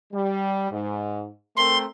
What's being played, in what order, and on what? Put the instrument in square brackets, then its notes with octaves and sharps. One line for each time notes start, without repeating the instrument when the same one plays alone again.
[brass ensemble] G3
G#2
[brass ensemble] A3 C4 A#4 [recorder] C6